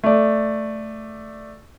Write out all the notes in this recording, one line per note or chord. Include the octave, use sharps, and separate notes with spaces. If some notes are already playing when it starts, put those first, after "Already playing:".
A3 D5